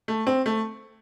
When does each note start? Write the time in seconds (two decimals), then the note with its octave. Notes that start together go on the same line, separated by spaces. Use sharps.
0.08 A3
0.27 C4
0.46 A3